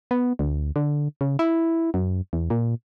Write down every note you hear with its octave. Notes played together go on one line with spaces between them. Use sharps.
B3
D2
D3
C#3
E4
F#2
E2
A#2